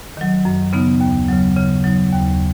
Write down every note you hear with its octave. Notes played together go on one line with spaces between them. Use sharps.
D#3 F#3
F#2
C#3 B3 D#4
D#2
C#3 F#3
C#3
F#3 D#4
D#2